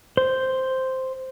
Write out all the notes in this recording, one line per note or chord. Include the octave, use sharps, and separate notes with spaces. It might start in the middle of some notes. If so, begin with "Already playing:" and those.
C5